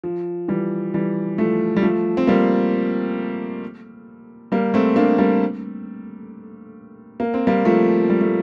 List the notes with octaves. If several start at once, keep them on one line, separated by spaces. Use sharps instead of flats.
F3
E3 G3
E3 G3
F3 A3
G3
F3 A3
C4
G3 A#3
G3 A#3
A3 C4
A#3 D4
G3 A#3
A#3
C4
G3 A#3
F3 A3
G3
A3